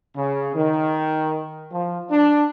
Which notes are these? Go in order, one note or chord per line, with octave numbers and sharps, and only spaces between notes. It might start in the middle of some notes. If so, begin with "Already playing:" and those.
C#3
D#3
F3
D4